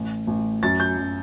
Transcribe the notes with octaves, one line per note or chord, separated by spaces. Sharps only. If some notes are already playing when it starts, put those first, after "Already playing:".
Already playing: A1
A1
F#2 A6
G6
F#2